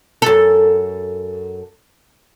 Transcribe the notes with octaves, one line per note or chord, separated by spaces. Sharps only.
F#2 A4